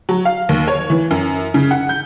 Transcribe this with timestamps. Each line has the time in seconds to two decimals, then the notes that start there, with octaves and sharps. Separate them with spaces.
0.09 F#3
0.25 F5
0.49 D#2
0.68 C#5
0.90 E3
1.11 F#2
1.54 C#3
1.71 F#5
1.89 G6